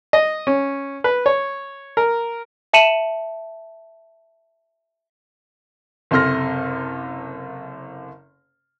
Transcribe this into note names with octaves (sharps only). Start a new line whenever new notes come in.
D#5
C#4
B4
C#5
A#4
E5 A5 C#7 D#7 E7 F#7
F#1 C3 A4 C6 F6 A#6